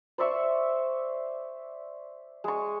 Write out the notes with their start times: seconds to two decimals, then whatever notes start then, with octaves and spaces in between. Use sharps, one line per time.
0.18 C5 D5 E5 C#6
2.44 G#3 C#6